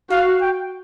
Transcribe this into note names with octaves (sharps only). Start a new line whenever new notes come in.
F#4 F5
G5